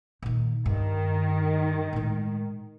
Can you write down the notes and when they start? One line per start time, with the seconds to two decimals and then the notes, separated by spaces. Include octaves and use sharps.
0.22 A#2 D#3
0.66 G2 D#3
1.93 A2 G#3